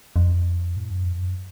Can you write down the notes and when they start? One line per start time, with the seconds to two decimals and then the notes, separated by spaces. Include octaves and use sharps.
0.16 F2
0.77 A2
0.90 F#2
1.04 F2
1.19 F#2